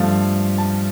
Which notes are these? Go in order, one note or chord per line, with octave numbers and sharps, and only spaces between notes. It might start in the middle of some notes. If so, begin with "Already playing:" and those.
Already playing: G2 F3 A3 F5
A5